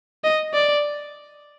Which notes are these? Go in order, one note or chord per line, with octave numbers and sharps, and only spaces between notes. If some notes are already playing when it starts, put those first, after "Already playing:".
D#5
D5